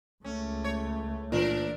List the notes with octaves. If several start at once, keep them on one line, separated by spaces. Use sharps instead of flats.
C#2 A3 C#4
C#5
A#2 E3 D4 A#4